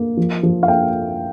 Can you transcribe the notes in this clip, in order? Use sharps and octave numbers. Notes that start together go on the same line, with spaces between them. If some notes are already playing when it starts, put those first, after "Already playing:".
Already playing: A#3
F3
F3
F5
A#3 G5